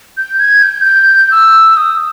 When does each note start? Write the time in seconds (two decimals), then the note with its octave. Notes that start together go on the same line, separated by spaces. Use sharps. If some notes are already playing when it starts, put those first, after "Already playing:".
0.17 G6
0.40 G#6
0.63 G6
0.85 G6
1.31 E6
1.77 D#6